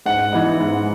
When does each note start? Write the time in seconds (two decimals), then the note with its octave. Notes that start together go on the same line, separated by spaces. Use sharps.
0.06 G#2 F#5
0.32 E3 B3 D#4
0.60 G#2